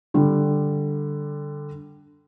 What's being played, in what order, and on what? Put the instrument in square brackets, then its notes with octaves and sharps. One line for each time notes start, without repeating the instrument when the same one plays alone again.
[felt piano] D3 G3